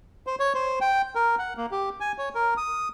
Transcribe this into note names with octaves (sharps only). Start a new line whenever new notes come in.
C5
C#5
C5
G5
A#4
F#5
A#3
G4
G#5
C#5
A#4
D#6